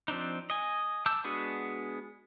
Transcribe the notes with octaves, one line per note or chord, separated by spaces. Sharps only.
F3 C4 D4 D#4
D#5 G#5
A5 D6 E6 G6
G#3 B3 D4 F#4 G#4